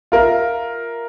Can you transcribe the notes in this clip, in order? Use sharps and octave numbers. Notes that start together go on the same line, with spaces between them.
F4 A#4 E5